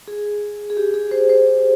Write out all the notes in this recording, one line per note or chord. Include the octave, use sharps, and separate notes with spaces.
G#4
G#4
G4
G#4
C5
C5